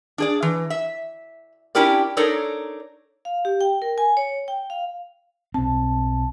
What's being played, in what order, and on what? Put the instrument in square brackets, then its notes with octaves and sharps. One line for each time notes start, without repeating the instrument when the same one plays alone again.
[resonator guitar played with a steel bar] D4 G#4 D5
E3
E5
C#4 D4 E4 G4 A#4 D5
D4 D#4 A4 A#4 C#5 D5
[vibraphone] F5
G4
G5
A#4
G#5
C#5
G5
F5
[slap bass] B1 C4 [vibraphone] A5